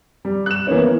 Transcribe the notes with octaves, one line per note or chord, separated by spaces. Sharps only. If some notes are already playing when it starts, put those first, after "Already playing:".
G3
F#6 E7
E3 A#3 B3 C#4